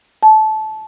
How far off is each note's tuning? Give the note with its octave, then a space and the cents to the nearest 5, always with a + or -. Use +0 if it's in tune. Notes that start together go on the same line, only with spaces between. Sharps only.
A5 -20